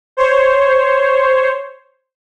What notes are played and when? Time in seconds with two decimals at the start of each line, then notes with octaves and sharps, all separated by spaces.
0.17 C5 C#5